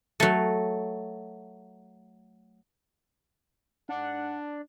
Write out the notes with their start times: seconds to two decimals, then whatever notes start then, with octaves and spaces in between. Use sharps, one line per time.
0.20 F#3 A3
3.89 G#2 D4 F#5